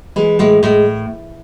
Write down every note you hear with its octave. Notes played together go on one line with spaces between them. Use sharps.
E3 G#3
A2 G#3
A2 G#3